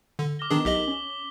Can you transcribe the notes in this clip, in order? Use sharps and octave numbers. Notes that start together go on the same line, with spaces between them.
D3
D6 F6 A#6 G7
D#3 B3 D4 D#4 G#4 A#4
B1 G4 D#5 B6 F#7 G7
C#4